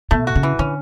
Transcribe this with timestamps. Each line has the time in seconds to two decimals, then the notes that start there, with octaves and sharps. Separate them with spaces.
0.11 B2 A3
0.27 F#4
0.36 C#3
0.43 E3
0.59 D3 C#4